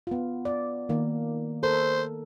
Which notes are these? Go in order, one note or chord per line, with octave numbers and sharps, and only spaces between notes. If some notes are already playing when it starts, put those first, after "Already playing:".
B3 F4
D5
D#3 A#3
A4 A#4 C5